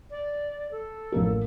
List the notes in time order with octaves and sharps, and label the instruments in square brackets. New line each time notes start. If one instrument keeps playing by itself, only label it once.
[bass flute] D5
A4
[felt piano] A1 A#3 A#4